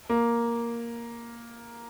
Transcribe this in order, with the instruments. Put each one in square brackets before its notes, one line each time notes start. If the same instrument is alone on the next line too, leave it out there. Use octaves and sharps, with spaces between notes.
[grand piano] A#3